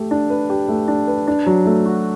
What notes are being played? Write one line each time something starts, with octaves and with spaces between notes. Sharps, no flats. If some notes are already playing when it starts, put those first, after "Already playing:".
Already playing: A3 G4
D4
B4
G4
A3
D4
B4
D4
F#3
A3
F#4